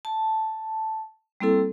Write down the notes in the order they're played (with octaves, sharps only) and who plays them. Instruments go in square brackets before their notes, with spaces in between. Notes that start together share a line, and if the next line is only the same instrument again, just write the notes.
[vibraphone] A5
G3 A#3 C4 E4 A4